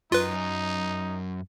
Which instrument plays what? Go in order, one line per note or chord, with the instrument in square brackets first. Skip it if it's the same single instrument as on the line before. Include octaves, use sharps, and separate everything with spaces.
[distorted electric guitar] F#2 [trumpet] D#4 [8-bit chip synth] F4 B4